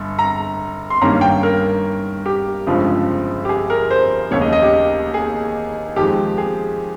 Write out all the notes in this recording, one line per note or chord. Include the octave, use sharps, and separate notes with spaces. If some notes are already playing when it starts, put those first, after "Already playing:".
Already playing: G1 G2
A#5
C6
G2 D#3 G3 A#3 C#4 A#5
G5
A#4
G4
G1 F2 C#3 F3 G#3
G4
G#4
A#4
C5
F1 D#2 C#3 C#5
D#5
D#5
G4
G#4
F2 D#3 G#3 G4
G#4